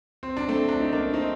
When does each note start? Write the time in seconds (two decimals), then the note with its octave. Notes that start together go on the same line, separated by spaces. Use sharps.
0.23 C4
0.37 D4
0.49 A3 C4
0.69 D4
0.80 D#4
0.93 A#3 D4
1.13 C4 D#4